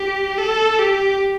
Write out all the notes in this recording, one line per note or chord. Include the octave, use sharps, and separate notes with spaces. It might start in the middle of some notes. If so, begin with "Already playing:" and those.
Already playing: G4
A4
G4